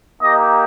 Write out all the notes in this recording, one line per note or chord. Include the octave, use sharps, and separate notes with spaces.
A#3 D#4 G4 D#5